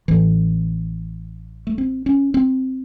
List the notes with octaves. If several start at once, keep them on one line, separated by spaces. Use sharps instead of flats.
A1 A2 E3
A3
C4
C#4
C4